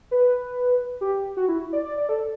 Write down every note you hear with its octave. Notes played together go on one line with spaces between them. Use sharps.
B4
G4
F#4
E4
D5
D5
D5
A4